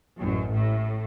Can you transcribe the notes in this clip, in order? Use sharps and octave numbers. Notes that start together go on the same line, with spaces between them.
A1 F#2
A2